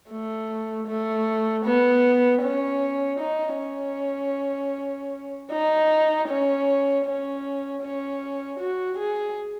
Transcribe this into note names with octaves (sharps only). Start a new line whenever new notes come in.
A3
A3
B3
C#4
D#4
C#4
D#4
C#4
C#4
C#4
F#4
G#4